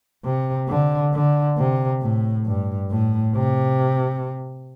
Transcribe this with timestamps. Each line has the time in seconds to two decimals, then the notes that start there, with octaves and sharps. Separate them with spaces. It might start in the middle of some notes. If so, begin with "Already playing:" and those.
0.24 C3
0.68 D3
1.13 D3
1.57 C3
2.02 A2
2.46 G2
2.90 A2
3.35 C3